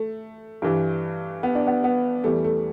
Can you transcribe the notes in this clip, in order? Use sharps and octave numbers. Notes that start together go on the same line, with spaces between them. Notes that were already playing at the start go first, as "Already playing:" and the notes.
Already playing: A3
G2 E3 G3
B3
D4
B3
B3
E2 E3 G3 A3
A3